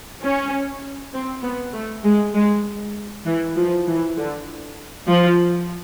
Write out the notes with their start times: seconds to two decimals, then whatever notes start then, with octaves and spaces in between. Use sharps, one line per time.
0.21 C#4
1.13 C4
1.43 B3
1.73 A3
2.03 G#3
2.34 G#3
3.25 E3
3.56 F3
3.87 E3
4.17 D3
5.08 F3